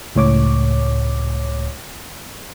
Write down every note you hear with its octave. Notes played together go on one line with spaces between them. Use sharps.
C#2 A2 C#5 D6